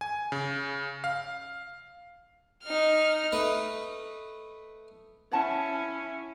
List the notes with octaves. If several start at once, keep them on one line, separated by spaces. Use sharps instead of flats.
G#5
C#3
F5
D#4 F6
A3 B4 D#5
C#4 E4 C#5 F#5 A5